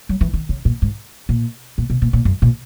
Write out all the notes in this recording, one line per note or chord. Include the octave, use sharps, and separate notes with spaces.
F#3
E3
D#3
C#3
A#2
G#2
A#2
A#2
B2
A#2
A#2
F#2
A#2